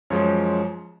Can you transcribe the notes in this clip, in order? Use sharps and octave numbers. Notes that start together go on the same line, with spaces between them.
F#2 F3 G#3 C#5